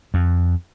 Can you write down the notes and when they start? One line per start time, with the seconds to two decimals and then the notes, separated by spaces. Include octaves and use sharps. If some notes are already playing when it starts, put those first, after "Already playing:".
0.14 F2